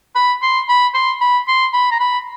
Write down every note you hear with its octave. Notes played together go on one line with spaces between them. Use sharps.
B5
C6
B5
C6
B5
C6
B5
A#5
B5